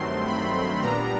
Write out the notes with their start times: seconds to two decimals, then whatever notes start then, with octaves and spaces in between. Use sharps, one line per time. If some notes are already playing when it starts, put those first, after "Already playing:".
Already playing: G2 D#3 F#3 A3 C4 C6
0.26 B5
0.82 A#2 G3 B3 D4 A#5